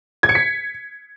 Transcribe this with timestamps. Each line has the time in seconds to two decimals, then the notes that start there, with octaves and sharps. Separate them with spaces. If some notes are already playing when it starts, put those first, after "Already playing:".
0.23 G#6
0.29 C#7
0.35 B6